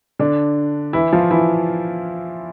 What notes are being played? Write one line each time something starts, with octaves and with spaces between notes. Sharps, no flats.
D3 D4
E3 E4
F3 F4
E3 E4